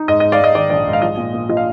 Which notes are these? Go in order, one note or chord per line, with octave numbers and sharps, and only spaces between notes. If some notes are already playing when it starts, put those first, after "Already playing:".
Already playing: D#4
G#2 D#5
G#2 D#5
D5 F5
G#2 D#5
D#3 D5
A#1 D5
G#2
F5
F3 D#5
A#2
A#2
F3 D#5
F5